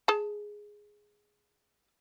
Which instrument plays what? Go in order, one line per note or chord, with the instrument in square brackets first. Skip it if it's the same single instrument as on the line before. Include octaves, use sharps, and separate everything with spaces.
[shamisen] G#4 A5